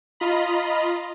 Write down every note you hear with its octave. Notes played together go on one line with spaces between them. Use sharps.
F4 D#5 A#5 B5